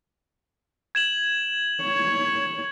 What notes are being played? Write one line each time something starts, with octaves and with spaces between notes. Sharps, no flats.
G#6 E7 F#7
C#5